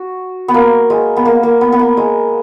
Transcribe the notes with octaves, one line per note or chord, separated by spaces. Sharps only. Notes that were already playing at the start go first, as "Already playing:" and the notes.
Already playing: F#4
B3
A#3
G#3
B3
A#3
A#3
B3
B3
A#3
G#3